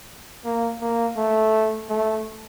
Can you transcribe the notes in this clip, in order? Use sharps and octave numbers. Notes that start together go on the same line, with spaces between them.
A#3
A#3
A3
A3